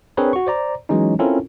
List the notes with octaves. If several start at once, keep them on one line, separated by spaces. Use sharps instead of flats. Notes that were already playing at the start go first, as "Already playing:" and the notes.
C4 D4 G#4 A#4 B4 C#5
F#4 C#6
C5 D5 A#5
E3 F#3 G#3 C#4 D#4
C4 C#4 E4 F4 A4 A#4